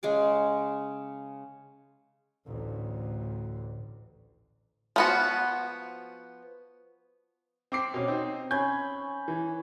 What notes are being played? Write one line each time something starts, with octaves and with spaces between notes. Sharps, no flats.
C#3 G#3 G#4 D6
A1 D2
F3 B3 F#4
C4 D6 C7
B2 C#4
C4 D#4
C#4 B5 G6 G#6
E3